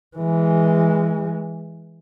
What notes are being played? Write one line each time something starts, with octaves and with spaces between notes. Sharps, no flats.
E3 G#3